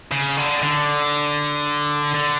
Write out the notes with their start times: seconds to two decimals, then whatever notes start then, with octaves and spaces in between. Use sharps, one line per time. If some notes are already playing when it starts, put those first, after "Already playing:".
0.12 C#3
0.37 D3
0.62 D3
2.14 D3